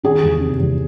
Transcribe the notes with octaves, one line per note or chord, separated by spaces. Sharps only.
D#3 G#4
E2
C3
E2